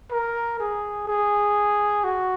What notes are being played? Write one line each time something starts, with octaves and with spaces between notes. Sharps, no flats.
A#4
G#4
G#4
F#4